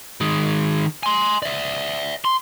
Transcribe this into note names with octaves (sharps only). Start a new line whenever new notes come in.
D#3 G#3
G#5 C6
D5 E5
C6